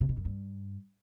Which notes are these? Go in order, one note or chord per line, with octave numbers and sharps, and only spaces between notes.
C3
B2
F#2
G2